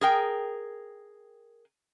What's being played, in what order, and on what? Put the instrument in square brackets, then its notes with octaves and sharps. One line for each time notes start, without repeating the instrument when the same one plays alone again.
[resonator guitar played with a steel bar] G#4 A#4 G5